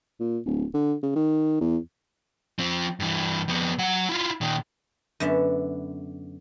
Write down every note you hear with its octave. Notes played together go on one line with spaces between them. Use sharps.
A#2
D1
D3
C#3
D#3
E2
F3 C4
G2 E3
F2 B3
F#3 F#5
E4 F4
A#2 D#3
F#2 D3 B3 E5